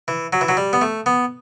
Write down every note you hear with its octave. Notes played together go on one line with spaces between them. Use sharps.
E3
F#3
E3
F#3
G3
B3
A3
B3